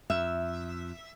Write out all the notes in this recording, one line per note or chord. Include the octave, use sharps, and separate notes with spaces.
F2 E5